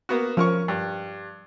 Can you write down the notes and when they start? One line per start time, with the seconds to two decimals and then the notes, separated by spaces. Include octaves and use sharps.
0.09 A#3 B3 F#4
0.37 F3 C#4 A#4 C#6
0.68 G2